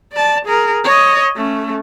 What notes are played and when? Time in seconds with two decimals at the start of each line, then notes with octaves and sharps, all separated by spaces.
0.13 D5 A5
0.45 G#4 A#4
0.84 C#5 D#5
1.37 A3 C#4